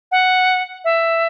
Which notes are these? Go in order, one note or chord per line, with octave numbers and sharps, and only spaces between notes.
F#5
E5